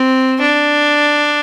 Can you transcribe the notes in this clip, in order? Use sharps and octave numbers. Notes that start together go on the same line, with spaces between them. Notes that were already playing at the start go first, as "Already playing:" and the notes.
Already playing: C4
D4